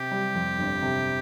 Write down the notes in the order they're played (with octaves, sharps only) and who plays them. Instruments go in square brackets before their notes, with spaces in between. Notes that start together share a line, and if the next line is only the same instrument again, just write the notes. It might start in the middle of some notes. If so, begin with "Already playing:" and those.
Already playing: [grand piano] C3 [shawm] G4
[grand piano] G3
F2
G1
C3